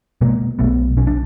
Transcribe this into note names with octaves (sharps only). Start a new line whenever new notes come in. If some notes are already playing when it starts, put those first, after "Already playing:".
B2 G#3 A#3
B1 A3 B3
B1 C#4
D4